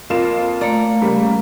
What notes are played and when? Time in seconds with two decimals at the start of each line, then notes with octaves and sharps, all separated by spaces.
0.10 F2 A#3 F4 E7
0.61 A3 D5 F5 A#5
1.02 C#3 G3 A#3